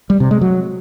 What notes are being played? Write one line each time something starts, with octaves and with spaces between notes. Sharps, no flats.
G3
C3
G#3
F#3